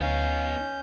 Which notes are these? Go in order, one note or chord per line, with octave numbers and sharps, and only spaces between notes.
D2 B3 C#4 D#4 F5 G6